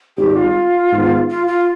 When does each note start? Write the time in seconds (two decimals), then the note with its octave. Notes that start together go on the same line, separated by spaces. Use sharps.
0.17 G#1 G#2 G3 G4
0.36 F4
0.92 G#2 D#3 B3
1.29 F4
1.47 F4